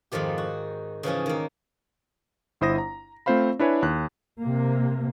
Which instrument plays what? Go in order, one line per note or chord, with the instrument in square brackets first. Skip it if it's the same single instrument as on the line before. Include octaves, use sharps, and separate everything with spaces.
[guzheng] F2 G#2 D#3 F3 G4
F#4
C#3 E3 F3 C#4
D#3 A#3
[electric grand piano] G1 E4 C5 D#6 A#6
A#5
A3 C4 F4 C5 F5 B5
D4 E4 B4 C#5 G#5
D#2 F#6
[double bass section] C3 A#3